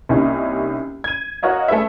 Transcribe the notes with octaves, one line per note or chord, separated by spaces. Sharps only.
C2 A#3 C#4 D#4 G4
G#6 D#7
F#4 A#4 C#5 D#5 F5
A3 G#4 A4 B4 E5